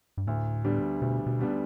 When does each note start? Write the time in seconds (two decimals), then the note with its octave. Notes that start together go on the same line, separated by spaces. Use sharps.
0.17 G2
0.27 D2 A2
0.64 D3 G3 B3 D4
1.02 D2 B2
1.26 B2
1.39 D3 G3 B3 D4